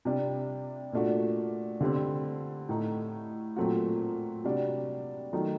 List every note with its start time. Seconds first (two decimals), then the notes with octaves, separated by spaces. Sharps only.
0.05 C3 G3 D4
0.92 A#2 A3 D4 F#4
1.81 D3 G3 C4
2.69 A2 A3 D#4
3.56 A#2 F#3 A3 C4 F#4
4.44 C3 G3 D4 F#4
5.33 D#3 F#3 A3 D#4